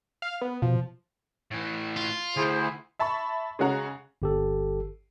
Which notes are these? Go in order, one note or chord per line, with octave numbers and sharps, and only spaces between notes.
F5
B3
B2 F3
A2 E3
F4
D2 E4 G#4 C5
E5 A5 B5 C#6
C#3 G#3 C#4 F#4 A#5 F7
G1 G4 A4